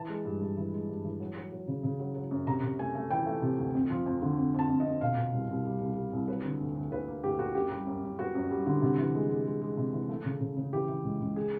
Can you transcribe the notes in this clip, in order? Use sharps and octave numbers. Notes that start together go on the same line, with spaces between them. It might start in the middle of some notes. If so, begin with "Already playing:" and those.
Already playing: E3 A5
G#3
G2
G2
E3
G#3
G2
E3
F#3
F#3
F#3
C#3
C#3
F#3
F#3
F#2
C3 A#5
C3
A3 G#5
A3
E3 G5
A3
C3
D2
F2
F3
F2
D3
F2
F2 A5
F2
D#5
F2
B2 F5
B2
C2
C2
G3
C2
G3
C2
F#3 B4
D3
D2
D2
D2 B4
A#3
D2 G4
A#3 F#4
F#2 G4
G3
F#2
F#2
B3 F#4
F#2
G3
D3
C3
E3
G#3
G#3
G#3
G#3
C3
E3
A3
C#3
C#3
C#3
E3 G4
E3
C#2
C#2
G#4